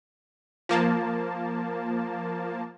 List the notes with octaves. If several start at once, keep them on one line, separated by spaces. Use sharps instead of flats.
F3 A#3 A5